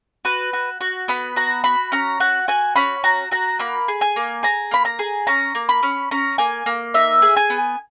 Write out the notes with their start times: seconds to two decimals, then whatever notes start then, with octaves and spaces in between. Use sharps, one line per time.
0.25 F#4 B4
0.53 F#4
0.81 F#4
1.08 B3 B5
1.36 F#4 A#5
1.64 F#4 B5
1.92 C#4 A#5
2.20 F#4 F#5
2.48 F#4 G#5
2.76 C#4 B5
3.04 F#4 A#5
3.31 F#4 A#5
3.59 A#3 B5
3.88 G#4
4.01 G#5
4.16 A#3
4.43 G#4 A#5
4.71 A#3 B5
4.85 A#5
4.99 G#4
5.27 C#4 A#5
5.55 A#3
5.69 B5
5.83 C#4
6.11 C#4 A#5
6.38 A#3 G#5
6.66 A#3
6.94 D#4 E5
7.22 G#4
7.37 G#5
7.50 B3